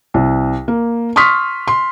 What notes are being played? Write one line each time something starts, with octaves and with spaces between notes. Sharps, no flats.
C2
A#3
C6 C#6 D#6 F6 B6
C6